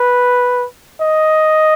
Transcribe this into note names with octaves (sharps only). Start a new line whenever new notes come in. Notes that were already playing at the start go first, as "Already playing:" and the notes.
Already playing: B4
D#5